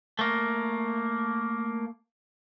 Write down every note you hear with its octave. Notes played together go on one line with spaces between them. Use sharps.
A3 A#3